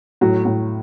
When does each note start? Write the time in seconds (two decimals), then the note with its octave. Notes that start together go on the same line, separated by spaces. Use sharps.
0.21 A2 F#3
0.45 A2